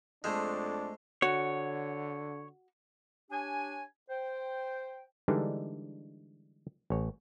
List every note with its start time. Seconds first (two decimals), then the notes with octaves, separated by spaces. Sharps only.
0.24 F2 G#3 A3 D4 G#4 C5
1.22 D3 F#4 C#5
3.30 D4 G4 C#5 G#5
4.09 C5 G5
5.28 D3 E3 G3 G#3 D4 D#4
6.90 A1 C#5